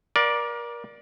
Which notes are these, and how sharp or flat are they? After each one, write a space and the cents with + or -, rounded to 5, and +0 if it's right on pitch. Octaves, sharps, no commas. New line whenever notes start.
A#4 +30 D5 +0 F5 +30